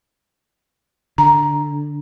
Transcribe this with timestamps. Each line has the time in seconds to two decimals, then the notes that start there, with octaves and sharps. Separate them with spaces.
1.18 D3 A#5